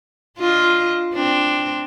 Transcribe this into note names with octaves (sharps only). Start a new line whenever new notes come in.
D4 F4 D#5
C4 D4